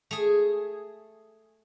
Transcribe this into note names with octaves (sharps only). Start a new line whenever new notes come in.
A3 G#4